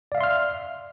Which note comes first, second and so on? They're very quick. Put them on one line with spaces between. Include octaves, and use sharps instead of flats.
D5 F5 E5 C6 F6